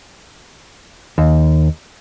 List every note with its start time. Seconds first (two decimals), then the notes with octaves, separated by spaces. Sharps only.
1.18 D#2